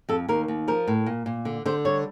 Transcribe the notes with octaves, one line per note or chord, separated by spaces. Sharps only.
F2 A4
D#2 A#4
D#2
F3 A#4
A2
A#2
A#2
D3
D3 C5
G3 C#5